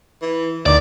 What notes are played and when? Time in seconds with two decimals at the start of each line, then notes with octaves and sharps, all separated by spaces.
0.22 E3
0.66 D2 D#3 D5 D6